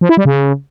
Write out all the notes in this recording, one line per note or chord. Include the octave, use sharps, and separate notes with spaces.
F3
E4
G3
C#3